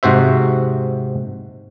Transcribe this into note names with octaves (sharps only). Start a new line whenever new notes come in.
G#2 C3 F#4 C5 E5